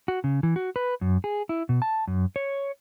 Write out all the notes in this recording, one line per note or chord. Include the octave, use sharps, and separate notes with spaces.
F#4
C#3
E3
F#4
B4
F#2
G#4
E4
B2
A5
F#2
C#5